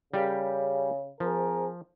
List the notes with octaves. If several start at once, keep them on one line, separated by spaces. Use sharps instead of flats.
C#3 G3 G4 A#4
F3 C4 G#4 A#4